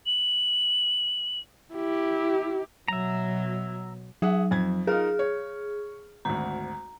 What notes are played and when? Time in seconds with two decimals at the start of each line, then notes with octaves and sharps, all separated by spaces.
0.06 F#7
1.74 E4 G4
2.88 B2 F#3 E5 A#5
4.22 F#3 G#4 E5 F#5
4.51 F2 G#6
4.87 D#4 F4 G#4 A#4 F6
5.19 C#5
6.25 G#1 D2 A#5